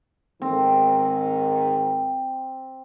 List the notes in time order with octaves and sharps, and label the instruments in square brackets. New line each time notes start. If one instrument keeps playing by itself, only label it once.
[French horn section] G#2 D#3 [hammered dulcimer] C4